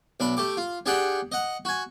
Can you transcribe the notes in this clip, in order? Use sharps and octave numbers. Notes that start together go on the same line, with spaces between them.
B1 D4 B5
A3 G4 D6
F4
D4 G4 G#4 D5 F#5 G5
D#5 F#5
F#4 G#5